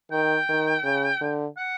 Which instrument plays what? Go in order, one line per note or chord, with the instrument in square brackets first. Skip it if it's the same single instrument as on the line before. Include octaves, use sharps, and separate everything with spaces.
[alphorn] D#3 [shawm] G5
[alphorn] D#3
C#3
D3
[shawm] F#5